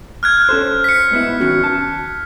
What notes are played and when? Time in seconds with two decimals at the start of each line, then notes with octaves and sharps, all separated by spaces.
0.23 F6 F#6 G#6
0.49 C#4 A4 C5
0.84 B6 C#7
1.11 G#2 B3 E4
1.40 D#3 C#4 F#4
1.64 A5